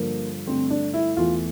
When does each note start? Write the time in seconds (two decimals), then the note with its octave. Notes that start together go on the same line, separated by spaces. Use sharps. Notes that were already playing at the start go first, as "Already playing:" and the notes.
Already playing: G2 D3 F3 A#3
0.47 G2 D3 A3 C4
0.70 D4
0.94 E4
1.17 E2 E3 A3 F4